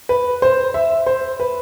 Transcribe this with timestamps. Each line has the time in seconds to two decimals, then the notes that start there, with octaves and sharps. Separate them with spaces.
0.09 B4
0.42 C5
0.74 E5
1.07 C5
1.40 B4